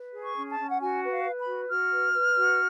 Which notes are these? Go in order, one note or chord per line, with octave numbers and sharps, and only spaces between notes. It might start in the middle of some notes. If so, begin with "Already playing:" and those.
Already playing: B4
G#4
C#6
C#4
A5
C#4
F#5
F#4 G#5
B4
F5
B4
B5
F#4
F#4 F6
B4
B4
F#4